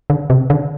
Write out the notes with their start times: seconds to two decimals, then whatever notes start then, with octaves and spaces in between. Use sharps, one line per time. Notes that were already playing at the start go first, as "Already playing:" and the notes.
0.10 D3
0.30 C3
0.50 D3